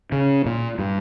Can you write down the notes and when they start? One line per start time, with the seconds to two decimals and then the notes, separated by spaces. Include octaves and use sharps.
0.12 C#3
0.46 A#2
0.78 G2